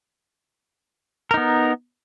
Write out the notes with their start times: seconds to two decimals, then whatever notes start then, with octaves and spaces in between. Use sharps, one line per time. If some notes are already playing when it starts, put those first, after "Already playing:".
1.31 A#4
1.34 D#4
1.37 B3